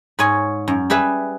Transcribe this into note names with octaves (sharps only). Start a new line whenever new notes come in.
G#2 G#4 C#5 G#5
F#2
G3 G#4 B4 E5